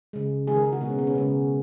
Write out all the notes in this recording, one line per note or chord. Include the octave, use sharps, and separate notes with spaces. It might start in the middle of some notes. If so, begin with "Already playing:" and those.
C#3 G#3
D#3 G#3 G#4
A#4
G#4
F#4
B2 G#3 B3
C#4
B3
C#4
C#3 G#3